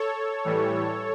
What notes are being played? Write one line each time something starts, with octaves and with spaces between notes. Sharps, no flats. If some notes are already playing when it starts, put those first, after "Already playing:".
Already playing: A4 C#5
A2 E3 G3